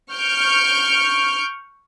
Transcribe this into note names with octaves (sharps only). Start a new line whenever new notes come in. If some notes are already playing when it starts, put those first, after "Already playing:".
C#6 F6 G6 D7